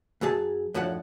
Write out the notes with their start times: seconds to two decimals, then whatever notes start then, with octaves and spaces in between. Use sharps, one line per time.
0.21 F#2 F#3 G#4 A5
0.74 F#2 A2 F3 D4 F#5